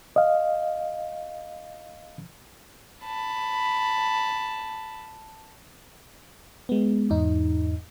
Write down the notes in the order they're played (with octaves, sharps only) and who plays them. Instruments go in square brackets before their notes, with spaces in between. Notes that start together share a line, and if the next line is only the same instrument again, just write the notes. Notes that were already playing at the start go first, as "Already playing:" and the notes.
[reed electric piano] D#5 F5
[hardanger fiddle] A5 B5
[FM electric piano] G#3 B3
E2 G#2 D#4